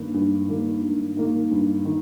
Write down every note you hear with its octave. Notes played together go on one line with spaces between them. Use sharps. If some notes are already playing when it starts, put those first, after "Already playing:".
Already playing: G2 D#3 A#3
G2
D#3 A#3
G2
D#3 A#3
G2
D#3